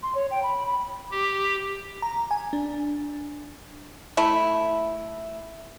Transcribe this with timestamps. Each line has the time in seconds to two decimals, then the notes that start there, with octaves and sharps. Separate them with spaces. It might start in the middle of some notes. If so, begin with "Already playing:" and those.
0.03 C6
0.15 C#5
0.31 G5
0.43 B5
0.67 B5
1.11 G4
2.02 A#5
2.31 G#5
2.53 D4
4.17 A3 E4